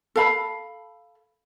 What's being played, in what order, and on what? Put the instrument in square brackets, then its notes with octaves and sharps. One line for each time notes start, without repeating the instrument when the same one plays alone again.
[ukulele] A4 F5 B5